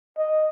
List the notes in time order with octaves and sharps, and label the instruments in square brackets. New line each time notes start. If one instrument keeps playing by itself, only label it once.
[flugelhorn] D#5